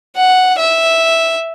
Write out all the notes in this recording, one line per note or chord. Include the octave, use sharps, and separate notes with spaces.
F#5
E5